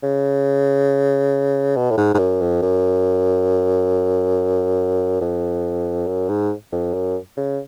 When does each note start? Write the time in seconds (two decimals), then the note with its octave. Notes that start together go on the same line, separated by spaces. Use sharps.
0.03 C#3
1.77 B2
1.91 A2
1.98 G#2
2.15 G#2
2.19 F#2
2.41 F2
2.62 F#2
5.21 F2
6.07 F#2
6.29 G#2
6.72 F2
6.94 F#2
7.37 C#3